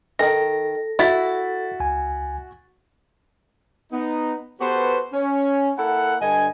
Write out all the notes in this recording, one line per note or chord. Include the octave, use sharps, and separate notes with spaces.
D#3 E3 A4 A#6
E4 F#4 A6 B6
C#2 G#5
B3 D#4
B3 F#4 G4 A4 B4 C5
C#4
A#3 E4 A4 F#5
G2 D3 D#5 G#5